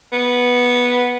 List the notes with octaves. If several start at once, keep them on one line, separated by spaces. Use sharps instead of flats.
B3